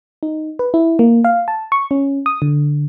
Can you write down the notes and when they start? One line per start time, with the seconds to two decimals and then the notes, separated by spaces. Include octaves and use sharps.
0.23 D#4
0.59 B4
0.74 E4
0.99 A#3
1.24 F5
1.48 A5
1.72 C#6
1.91 C#4
2.26 D#6
2.42 D3